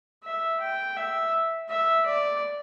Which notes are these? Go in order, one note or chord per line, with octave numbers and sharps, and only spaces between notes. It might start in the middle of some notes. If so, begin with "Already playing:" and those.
E5
G5
E5
E5
D5